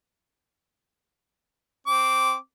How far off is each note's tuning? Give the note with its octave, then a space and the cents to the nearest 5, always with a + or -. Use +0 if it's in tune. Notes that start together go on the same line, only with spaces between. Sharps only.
C4 +0 D6 -10